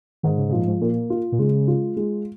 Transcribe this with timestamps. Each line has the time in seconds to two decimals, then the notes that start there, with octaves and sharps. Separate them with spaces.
0.23 G#2 D#3
0.38 C#3
0.49 C#3
0.53 A#2 F3
0.67 G#2
0.81 A#2 A#3
1.10 F4
1.32 A#2
1.39 C#3 G#3
1.68 F4
1.97 G#3